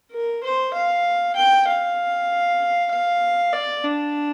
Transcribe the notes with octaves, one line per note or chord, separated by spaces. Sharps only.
A#4
C5
F5
G5
F5
F5
D5
D4